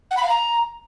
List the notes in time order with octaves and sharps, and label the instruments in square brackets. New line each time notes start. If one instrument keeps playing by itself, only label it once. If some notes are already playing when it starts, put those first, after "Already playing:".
[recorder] F#5
B5
F5
A#5